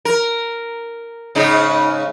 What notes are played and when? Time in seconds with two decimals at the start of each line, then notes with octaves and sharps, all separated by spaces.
0.05 A#4
1.35 G#2 C#3 D#4